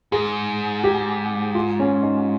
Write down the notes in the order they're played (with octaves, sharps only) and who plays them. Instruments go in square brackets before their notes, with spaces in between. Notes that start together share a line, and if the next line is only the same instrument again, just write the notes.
[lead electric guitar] G#2 [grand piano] G#4
[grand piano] G4
F4
C#4
D#4